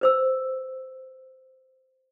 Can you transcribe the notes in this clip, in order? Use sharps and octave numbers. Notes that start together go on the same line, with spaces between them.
B4 C5 E6